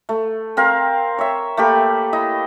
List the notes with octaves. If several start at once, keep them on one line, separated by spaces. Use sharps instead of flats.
A3
C4 A#4 F5
C#5 E5
A3 A#3 G4 B5
E4 D#5